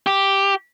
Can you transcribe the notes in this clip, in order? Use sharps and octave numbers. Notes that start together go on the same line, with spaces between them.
G4